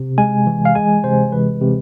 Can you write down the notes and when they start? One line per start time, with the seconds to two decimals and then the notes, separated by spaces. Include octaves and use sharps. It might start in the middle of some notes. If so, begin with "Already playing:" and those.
Already playing: C3
0.18 G#3 G#5
0.47 E3
0.65 F5
0.75 G#3 G#5
1.04 C3 C5
1.32 E3 B4
1.61 C3